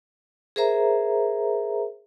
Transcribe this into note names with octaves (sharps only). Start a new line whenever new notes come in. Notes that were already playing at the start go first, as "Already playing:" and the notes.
G#4 A#4 C5 E5 A#5